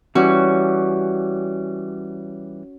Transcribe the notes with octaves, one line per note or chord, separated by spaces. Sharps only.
E3 G3 C#4 F#4